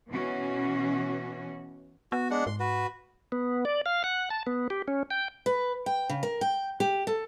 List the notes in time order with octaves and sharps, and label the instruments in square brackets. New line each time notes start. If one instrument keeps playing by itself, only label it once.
[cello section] B2 E3 C#4 F#4
[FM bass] B3 [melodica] F#4
[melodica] G#3 D4 F#5
[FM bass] G#2 [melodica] C6
[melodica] F#4 B4
[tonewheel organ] B3
D5
F5
F#5
A5
B3
G4
C#4
G5
[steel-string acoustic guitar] B4
G5
C#3
A#4
G5
G4
A4